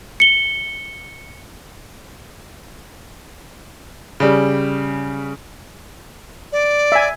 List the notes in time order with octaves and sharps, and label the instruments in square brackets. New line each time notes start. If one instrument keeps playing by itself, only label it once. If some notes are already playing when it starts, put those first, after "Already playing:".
[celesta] C#7 G7
[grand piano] C#3 G3
[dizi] D5
[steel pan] E5 G#5